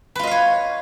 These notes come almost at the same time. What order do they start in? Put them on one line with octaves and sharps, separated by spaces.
B4 F4 D#5 F5 C#5